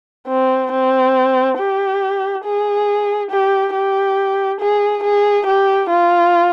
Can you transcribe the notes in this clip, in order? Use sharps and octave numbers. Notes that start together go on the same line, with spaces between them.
C4
C4
G4
G#4
G4
G4
G#4
G#4
G4
F4